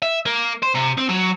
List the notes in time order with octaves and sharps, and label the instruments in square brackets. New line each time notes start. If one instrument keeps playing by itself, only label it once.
[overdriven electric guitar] E5
A#3
C5
C3
C4
F#3